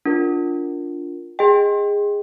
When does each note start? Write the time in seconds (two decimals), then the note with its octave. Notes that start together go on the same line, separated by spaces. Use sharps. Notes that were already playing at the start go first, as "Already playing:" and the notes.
0.05 D4 F4 A#4
1.39 G#4 D#5 G5